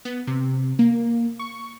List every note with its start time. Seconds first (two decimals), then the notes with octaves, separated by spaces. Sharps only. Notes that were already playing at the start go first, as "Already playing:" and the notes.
0.05 B3
0.27 C3
0.79 A#3
1.39 C#6